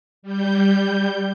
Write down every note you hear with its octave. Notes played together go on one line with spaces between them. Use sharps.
G3 G6